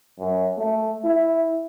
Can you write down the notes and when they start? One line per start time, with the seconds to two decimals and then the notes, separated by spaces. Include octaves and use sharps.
0.19 F#2
0.58 A3
1.04 E4